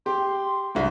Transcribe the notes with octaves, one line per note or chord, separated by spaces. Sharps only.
G4 C6
C2 G2 E5